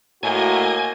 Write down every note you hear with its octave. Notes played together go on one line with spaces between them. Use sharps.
A2 A#3 F#4 D#5 G#5